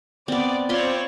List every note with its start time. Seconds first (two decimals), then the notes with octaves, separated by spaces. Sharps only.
0.28 B3 C4 D5
0.69 C4 F4 C#5 D5 B5 C6